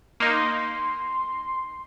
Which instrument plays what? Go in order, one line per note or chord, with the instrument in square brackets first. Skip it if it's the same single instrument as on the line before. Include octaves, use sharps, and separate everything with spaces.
[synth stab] A#3 D#4 [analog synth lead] C6